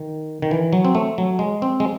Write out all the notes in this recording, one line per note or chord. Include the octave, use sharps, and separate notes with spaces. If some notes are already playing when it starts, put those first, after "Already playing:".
Already playing: D#3
D#3
E3
F#3
C4
A3
F#3
G#3
C4
G#3